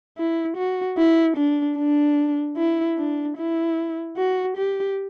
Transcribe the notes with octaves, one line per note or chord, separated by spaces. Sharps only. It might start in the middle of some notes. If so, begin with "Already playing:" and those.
E4
F#4
E4
D4
D4
E4
D4
E4
F#4
G4